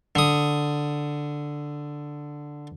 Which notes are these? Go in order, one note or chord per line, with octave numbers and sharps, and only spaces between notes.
D3 D#6